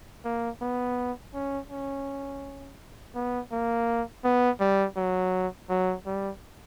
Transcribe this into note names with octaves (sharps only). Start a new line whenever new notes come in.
A#3
B3
C#4
C#4
B3
A#3
B3
G3
F#3
F#3
G3